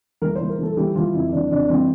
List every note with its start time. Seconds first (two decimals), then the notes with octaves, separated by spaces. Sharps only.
0.22 E3 A#4
0.36 E3 C5
0.49 A#4
0.59 E3 A4
0.77 E3 G4
0.95 E3 F4
1.14 F2 E4
1.32 E3 D4
1.51 F2 D4
1.70 E3 C4